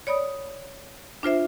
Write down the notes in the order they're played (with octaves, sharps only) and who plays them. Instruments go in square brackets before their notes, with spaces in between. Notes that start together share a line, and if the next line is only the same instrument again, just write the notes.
[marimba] C#5 D5 B5 D#6
D4 F4 C5 E5